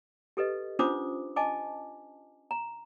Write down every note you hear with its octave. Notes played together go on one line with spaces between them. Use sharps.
G4 A4 B4 D#5
C#4 D4 F4 C5 D6 D#6
D#5 G#5 A5 D6
A#5